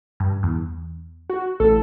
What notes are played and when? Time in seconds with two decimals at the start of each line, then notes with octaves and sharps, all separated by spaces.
0.20 G2
0.43 E2
1.30 F#4
1.60 A1 A4